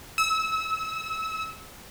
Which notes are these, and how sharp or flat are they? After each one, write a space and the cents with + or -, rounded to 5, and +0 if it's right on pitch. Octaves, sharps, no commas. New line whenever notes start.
E6 -30